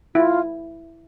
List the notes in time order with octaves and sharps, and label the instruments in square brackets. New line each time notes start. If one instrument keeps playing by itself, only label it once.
[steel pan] E4 [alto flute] F4